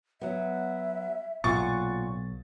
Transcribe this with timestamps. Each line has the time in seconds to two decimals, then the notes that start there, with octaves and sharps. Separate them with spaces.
0.21 F#3 B3 E5
1.44 B1 A#2 F4 F#4 C#6 A6